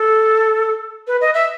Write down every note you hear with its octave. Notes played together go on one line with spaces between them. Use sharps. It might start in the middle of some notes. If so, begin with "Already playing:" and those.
Already playing: A4
B4
D#5
E5